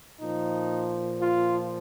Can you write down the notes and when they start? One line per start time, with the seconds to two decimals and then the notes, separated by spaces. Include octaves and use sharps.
0.20 A#2 F3 D#4
1.21 F4